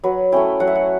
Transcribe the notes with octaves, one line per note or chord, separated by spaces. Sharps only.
F#3 B4
A3 C#4 E4 G5
F#3 F#5
E5
F#5